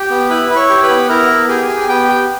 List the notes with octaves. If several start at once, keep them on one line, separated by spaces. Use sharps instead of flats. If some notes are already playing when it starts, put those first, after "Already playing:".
Already playing: G4
B3
E4 B4 B5
E4 B5
C#5 C#6
G4
B4 B5
B3
E4 A#4 A#5
B3
G4 G#4 G#5
G4
G#5
B3 G4 G5
G4